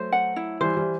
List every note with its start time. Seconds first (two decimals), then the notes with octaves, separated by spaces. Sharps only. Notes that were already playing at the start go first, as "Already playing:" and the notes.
Already playing: F#3 A3 C5
0.12 F#5
0.36 E4
0.61 E3 G3 C5
0.77 E3 G3